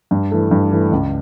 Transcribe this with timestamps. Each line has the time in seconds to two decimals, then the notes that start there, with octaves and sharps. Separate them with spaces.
0.11 G2
0.31 E3 A3
0.51 G2
0.71 E3 A3
0.91 C#2